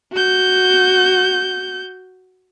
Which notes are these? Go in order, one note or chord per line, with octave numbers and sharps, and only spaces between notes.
F#4 G6